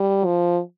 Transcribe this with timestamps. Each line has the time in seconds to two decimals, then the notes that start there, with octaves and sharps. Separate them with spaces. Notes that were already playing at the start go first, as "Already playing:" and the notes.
Already playing: G3
0.25 F3